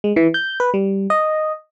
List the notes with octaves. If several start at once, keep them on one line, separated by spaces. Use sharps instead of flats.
G#3
E3
G6
B4
G3
D#5